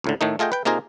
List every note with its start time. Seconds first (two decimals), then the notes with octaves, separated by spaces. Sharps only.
0.04 C#2 A2 D3
0.21 A2 D#3 A3 D#4
0.39 A3 F4 G#4 D#5 G5
0.52 B4 G5
0.65 C3 A#3 D#4 F4 G#4 A#5